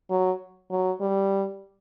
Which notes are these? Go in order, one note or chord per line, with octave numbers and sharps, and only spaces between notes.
F#3
F#3
G3